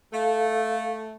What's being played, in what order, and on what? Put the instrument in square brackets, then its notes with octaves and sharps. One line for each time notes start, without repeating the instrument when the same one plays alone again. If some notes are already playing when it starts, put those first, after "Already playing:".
[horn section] A3 [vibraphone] A4 F5